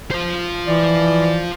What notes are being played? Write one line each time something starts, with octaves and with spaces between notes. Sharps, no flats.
F3 C5
E3 D5